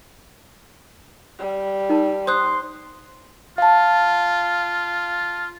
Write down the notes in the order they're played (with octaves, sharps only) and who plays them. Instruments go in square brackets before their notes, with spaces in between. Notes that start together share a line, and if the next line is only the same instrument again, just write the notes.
[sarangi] G3
[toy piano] D#4 A#4 A5
[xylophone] C5 D#6 F#6 [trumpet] C6
[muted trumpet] F4 [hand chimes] F5 A5